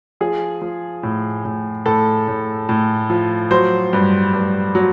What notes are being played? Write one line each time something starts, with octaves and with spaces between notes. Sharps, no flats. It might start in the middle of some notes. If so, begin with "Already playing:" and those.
F3 G#4
F3
A2
A2
A2 A4
A2
A2
F3
F#3 C5
G2
G2
F#3